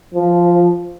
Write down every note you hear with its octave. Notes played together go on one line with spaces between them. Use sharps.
F3